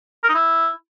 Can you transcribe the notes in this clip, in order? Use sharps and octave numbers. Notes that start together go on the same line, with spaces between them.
A#4
D#4
E4